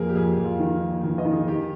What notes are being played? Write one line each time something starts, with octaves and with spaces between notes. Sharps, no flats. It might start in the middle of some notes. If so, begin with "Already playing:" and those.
Already playing: F2 A#3 G#4 A#4
G4
F2 G#4
G4
F2
F4
D#3 D#4
A#3
D#4
D#3 F4
D#5
D#3
G#4
D#3 G4